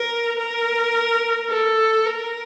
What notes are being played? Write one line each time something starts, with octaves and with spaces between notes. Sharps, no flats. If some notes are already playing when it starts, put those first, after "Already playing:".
Already playing: A#4
A#4
A4
A#4